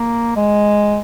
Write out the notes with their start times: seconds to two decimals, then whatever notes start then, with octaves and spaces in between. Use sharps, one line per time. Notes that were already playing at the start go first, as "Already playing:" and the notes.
Already playing: A#3
0.36 G#3